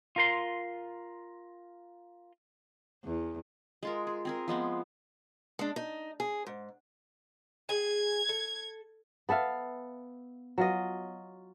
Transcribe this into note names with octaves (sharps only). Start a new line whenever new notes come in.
F4 A#4 C6
E2
G#3 F4 A#4
G#4
C4 G#4 A#4
F3 G#3 B3 C4
G#3 D4
D#4
G#4
G#2
G#4 G#5 G#6
A4
B3 A4 E5 F5
F#3 F4 D#5